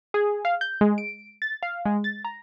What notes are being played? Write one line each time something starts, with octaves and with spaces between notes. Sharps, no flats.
G#4
F5
G6
G#3
D7
A6
F5
G#3
A6
A#5